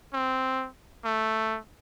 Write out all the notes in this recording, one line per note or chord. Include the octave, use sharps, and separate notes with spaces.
C4
A3